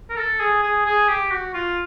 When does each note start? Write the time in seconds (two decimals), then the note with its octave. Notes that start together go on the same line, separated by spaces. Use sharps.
0.10 A#4
0.16 A4
0.40 G#4
0.63 G#4
0.85 G#4
1.09 G4
1.31 F#4
1.54 F4